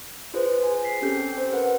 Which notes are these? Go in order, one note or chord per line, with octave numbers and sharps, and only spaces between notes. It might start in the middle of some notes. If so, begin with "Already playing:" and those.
F4 G#4 B4 C5
G#5
B6 C7
C4 C#4 G4 A4 G6
C5
A#4 B4 F#5